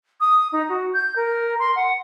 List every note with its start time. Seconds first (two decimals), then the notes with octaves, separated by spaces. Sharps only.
0.20 D#6
0.52 D#4
0.69 F#4
0.93 G6
1.16 A#4
1.59 C6
1.76 F#5